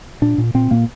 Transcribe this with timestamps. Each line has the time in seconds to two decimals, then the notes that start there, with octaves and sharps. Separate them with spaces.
0.22 A#2 D4
0.38 A#2
0.54 A#2 C4
0.71 A#2 A#3